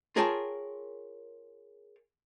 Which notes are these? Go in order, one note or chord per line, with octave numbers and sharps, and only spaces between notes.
F4 G#4 A#4 C#5 G5 A5